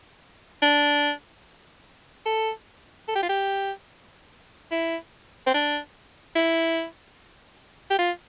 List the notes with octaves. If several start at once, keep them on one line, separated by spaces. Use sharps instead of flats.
D4
A4
A4
G4
F4
G4
E4
C4
D4
E4
G4
F4